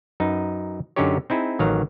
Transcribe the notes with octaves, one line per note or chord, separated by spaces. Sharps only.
F#2 D#4 B4
F#2 D3 C#4 D#4 G4 C#5
C4 D#4 E4 G#4
A1 D#3 F#3 F5 A#5